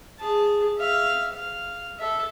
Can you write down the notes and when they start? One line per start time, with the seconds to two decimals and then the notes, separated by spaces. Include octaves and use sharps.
0.19 G#4 A5
0.78 E5 F5
1.33 F5
1.99 A4 E5